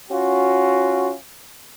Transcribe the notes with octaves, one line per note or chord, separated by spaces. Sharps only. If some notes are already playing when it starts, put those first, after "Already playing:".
C#4 F4 F#4